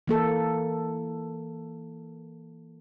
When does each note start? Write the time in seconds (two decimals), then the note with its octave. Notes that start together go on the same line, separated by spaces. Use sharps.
0.08 E3 A#3 A4